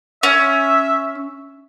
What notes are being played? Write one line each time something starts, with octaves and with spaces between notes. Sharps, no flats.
C#4 E5